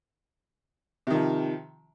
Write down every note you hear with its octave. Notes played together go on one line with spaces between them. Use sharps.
C3 D#3 F3